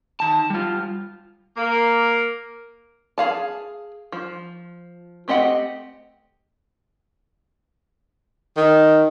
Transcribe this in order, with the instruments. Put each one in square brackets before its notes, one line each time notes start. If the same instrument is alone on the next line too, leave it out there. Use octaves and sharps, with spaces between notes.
[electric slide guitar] D#3 A5
G3 F4
[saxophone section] A#3
[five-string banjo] G#4 F5 A5
F3
A3 C4 G4 D#5 F#5
[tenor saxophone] D#3